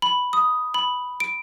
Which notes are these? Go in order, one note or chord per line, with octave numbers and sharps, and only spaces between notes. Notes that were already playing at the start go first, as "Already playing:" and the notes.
B5
D#6
B5
D7